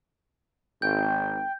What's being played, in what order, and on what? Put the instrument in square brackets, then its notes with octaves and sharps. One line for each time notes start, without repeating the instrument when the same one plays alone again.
[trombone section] G#1 [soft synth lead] G5 [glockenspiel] G6